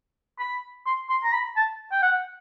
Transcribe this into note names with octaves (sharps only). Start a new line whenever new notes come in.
B5
C6
C6
A#5
B5
A5
G5
F#5